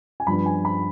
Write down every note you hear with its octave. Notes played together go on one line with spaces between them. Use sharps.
G#5
G2 F3 B3 D4 B5
G#5
B5